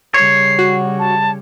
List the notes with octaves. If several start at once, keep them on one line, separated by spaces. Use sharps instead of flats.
C#3 G3 C#5 C7
F#4
A5